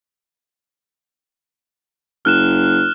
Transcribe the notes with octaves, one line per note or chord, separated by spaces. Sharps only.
F#1 F6 F#6 E7